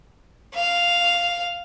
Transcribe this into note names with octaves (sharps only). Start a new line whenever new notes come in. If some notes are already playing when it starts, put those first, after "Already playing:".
F5